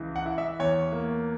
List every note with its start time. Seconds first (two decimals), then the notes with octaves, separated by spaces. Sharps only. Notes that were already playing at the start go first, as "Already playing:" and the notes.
Already playing: C#2 E3
0.16 F#5
0.26 E4
0.38 E5
0.59 E2 C#5
0.92 A#3